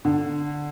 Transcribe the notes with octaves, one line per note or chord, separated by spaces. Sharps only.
D3